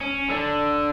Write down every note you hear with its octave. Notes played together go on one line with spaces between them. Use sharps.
C#4
D3 D4